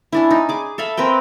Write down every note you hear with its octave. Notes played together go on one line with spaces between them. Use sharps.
C#4 D4 E4
D#4
G#4 D6
A4 E5 F5 B5
C4 A#4 B4 G5